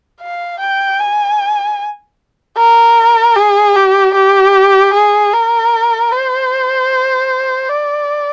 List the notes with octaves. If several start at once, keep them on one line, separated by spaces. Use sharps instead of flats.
F5
G5
G#5
A#4
G#4
G4
G4
G#4
A#4
C5
D5